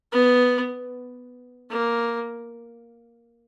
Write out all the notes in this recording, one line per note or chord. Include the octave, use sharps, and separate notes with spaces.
B3
A#3